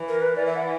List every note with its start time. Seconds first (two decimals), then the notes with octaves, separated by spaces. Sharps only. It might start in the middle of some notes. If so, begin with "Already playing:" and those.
Already playing: E3
0.09 A#4
0.22 B4
0.36 E3 D5
0.46 E5
0.56 F#5